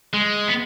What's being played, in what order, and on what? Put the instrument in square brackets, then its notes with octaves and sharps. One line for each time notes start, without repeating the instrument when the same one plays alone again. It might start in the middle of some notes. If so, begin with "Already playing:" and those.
[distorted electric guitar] G#3
B3